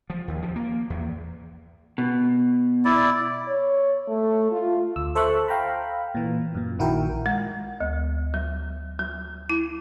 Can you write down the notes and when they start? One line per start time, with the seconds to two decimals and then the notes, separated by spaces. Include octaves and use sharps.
0.10 F3
0.28 D#2
0.42 F3
0.56 A#3
0.90 E2
1.98 B2
2.85 E4 D5
3.48 C#5
4.08 A3
4.52 F4
4.96 D2 E6
5.15 A4 C5 E5 A5 C#6 F#6
5.48 F5 G5 A#5 B5
6.15 A#2 E3
6.55 F#2 A#2
6.79 A#1 D#3 E4 F#4 A#4 G5
7.26 G#3
7.81 D2
8.34 F#3
8.99 F#3
9.50 E4